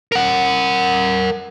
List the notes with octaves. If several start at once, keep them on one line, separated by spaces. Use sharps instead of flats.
A#4 F#5